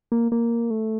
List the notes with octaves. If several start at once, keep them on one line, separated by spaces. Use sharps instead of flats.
A#3
A#3
A3